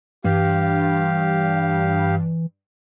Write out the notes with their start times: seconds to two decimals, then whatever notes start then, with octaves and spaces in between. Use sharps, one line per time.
0.24 G2 E3 G4 F5